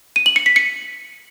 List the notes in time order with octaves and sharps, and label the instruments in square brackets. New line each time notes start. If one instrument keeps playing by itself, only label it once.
[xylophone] D#7
F#7
C#7
B6
C#7